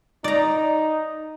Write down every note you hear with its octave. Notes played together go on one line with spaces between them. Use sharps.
D#4 D5 A#5